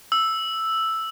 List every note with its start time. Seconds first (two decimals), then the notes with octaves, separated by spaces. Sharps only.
0.12 E6